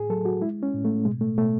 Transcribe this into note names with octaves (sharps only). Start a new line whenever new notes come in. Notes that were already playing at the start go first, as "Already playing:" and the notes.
Already playing: A2 G#4
F#3 A4
F#4
G#3 E4
C#4
A2
A3
B2 G#3
A3
B2 A3